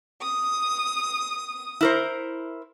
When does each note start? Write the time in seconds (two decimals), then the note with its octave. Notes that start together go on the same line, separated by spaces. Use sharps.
0.23 D#6
1.81 E4 A#4 C5